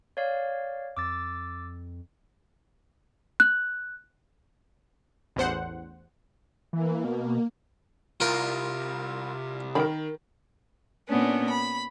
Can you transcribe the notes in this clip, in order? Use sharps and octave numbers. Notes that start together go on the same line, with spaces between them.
C#5 D5 F5
F2 D6 E6 A6
F#6
A1 E2 C5 F#5
E3 A#3
B2
C2 F4 A#4
D#3 A#4 B5
A#2 B3 C#4 D4
B5